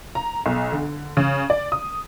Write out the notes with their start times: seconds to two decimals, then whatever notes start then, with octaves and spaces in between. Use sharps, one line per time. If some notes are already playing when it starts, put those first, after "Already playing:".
0.15 A#5
0.46 B1
0.72 D3
1.17 C#3
1.50 D5
1.72 D#6